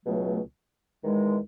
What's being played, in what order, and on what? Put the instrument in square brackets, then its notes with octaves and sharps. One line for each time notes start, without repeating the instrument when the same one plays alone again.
[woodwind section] C#2 B2 F#3 A3
E2 D#3 G#3